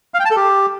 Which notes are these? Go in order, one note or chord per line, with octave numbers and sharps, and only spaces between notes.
F5
G5
A5
A4
G4